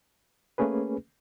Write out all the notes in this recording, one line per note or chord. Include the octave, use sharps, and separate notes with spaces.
A3 A#3 C#4 G#4 B4